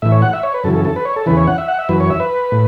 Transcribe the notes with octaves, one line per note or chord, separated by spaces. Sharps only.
A2 E3 E5
C#5
F#5
E5
C#5
B4
F#2 C#3 E3 A4
A4
A4
B4
C#5
A4
E2 C#3 E3 B4
C#5
F#5
E5
F#5
E5
F#2 E3 B4
C#5
E5
B4
A2